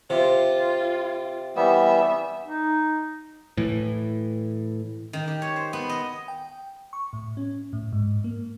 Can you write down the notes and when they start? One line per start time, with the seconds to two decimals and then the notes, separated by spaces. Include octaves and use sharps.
0.10 C3 F4
1.56 E3 G3 B3 E5
2.44 D#4
3.57 A2 E3
5.13 D#3
5.28 G4
5.42 C#5
5.56 C5
5.73 B3
5.89 D#5
6.28 G5
6.93 C#6
7.13 A2
7.37 C#4
7.73 A2
7.92 G#2
8.24 A#3